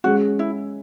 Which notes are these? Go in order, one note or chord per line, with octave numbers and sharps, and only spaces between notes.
G#3 C#4 F#4 G#4
E4